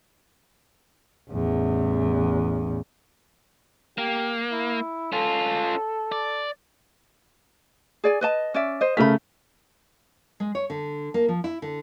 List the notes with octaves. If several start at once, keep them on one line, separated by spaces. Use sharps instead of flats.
A1 E2
A#3 G4
E4
C#4 F4 A4
D5
G#4 D5 G#5
B4 D#5 A5
C#4 D5 E5
C5 D#5
C#3 A3 A#4 B5 B6
G#3
C#5
D3
A#3
F3
E4
D3